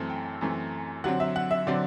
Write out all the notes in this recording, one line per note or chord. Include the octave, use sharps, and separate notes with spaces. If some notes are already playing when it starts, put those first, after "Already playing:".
Already playing: F#2 E3 A3 C4 A5
G5
F#2 E3 A3 C4
D3 F#3 C4 F#5
E5
F#5
E5
D3 F#3 C4 D5